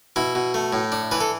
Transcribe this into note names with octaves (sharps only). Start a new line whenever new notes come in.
B2 E4
B2
A3
A2
D4
E3 B4
A4